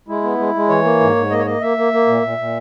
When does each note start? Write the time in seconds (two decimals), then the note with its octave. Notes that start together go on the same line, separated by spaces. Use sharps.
0.08 G#3 E4
0.23 B3
0.38 G#3
0.54 G#3
0.69 E3 C#5
0.84 A#3
1.00 G#2
1.16 G#2
1.30 A#3 D#5
1.39 C#5
1.45 A#3 D#5
1.62 A#3 E5
1.77 A#3
1.93 A#3
2.07 A#2
2.22 A#2
2.38 A#2